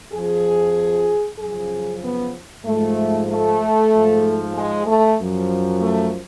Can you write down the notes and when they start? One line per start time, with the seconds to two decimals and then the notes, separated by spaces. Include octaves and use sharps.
0.13 F2 F3 G#4
1.39 F#2 C#3 F3 G#4
2.02 B3
2.65 G#2 F3 A3
3.29 A3
3.92 G#2 F3
4.54 G#3
4.86 A3
5.17 F#2 F3
5.80 A3